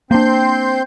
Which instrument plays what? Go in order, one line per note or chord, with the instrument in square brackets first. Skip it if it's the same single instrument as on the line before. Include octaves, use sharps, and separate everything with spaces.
[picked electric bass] A#3 D4 [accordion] C4 C6 G6